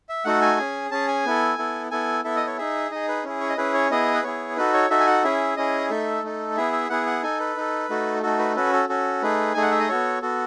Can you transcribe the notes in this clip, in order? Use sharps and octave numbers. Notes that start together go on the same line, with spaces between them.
E5
A3 D#4 F#4 A4 F#5
G#5
C#4 G#4
C#4 G#4 A5
G#5
B3 E4 A4
B3 E4 A4
B3 E4 A4 G#5
B3 E4 A4 E5
D#5
C#5
D#4 G#4 E5
D#4 G#4 D#5
B4
C#4 E4 G#4
C#5
D#5
C#4 E4 G#4 B4
C#5
B3 E4 G#4 D#5
B4
B3 E4 G#4 C#5
D#4 F#4 A4 B4
C#5
D#4 F#4 A4 E5
G#5
F#5
C#4 E4 G#4 E5
C#4 E4 G#4 D#5
A3 D#4 A4 E5
A3 D#4 A4
B3 E4 G#4 E5
E5
B3 E4 G#4 F#5
F#5
D#4 A4 G#5
B4
D#4 A4
A3 D#4 F#4 A4
A3 D#4 F#4 A4
B4
C#4 F#4 A4 B4
A4
C#4 F#4 A4
A3 D#4 G#4 B4
A3 D#4 G#4 G#5
F#5
E5
D#5
B3 F#4 A4 C#5
B3 F#4 A4